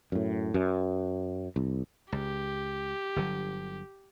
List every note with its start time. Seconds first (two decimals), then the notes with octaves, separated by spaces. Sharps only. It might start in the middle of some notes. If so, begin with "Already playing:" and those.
0.12 F#2 A2
0.54 F#2
1.56 C2
2.12 C#2 G4
3.16 G1 D3 F#3